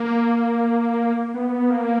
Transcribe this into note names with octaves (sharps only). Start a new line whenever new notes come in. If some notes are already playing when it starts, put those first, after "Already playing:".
Already playing: A#3
B3
A#3